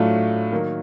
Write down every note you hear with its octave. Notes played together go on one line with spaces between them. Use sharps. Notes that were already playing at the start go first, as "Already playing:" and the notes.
Already playing: A2 F#3 A3 D4 F4
D#3 F#3 A#3